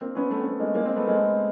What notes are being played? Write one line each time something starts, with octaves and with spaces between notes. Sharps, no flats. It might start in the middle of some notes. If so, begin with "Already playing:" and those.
A#3 C4
B3 C#4
A3 B3
C4
A3 B3
G#3 A#3
G#3 A#3
A#3 C4
A3 B3
G#3 A#3
A3 B3